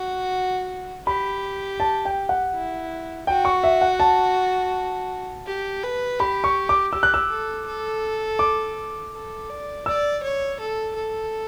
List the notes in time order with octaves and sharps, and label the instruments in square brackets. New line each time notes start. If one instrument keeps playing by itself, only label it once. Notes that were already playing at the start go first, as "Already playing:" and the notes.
Already playing: [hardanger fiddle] F#4
[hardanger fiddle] G4 [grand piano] B5
[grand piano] A5
G5
F#5
[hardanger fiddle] E4
[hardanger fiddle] F#4 [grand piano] G5
[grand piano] C#6
E5
F#5
A5
[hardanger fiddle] G4
B4
[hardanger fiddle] G4 [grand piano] B5
[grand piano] C#6
D6
[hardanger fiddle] G4 [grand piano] E6
[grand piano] F#6
E6
[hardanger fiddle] A4
A4
[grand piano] D6
[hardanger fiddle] A4
D5
[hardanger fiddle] D5 [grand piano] E6
[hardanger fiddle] C#5
A4
A4